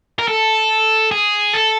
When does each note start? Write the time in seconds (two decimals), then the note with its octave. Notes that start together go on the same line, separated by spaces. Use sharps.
0.19 A#4
0.28 A4
1.11 G#4
1.53 A4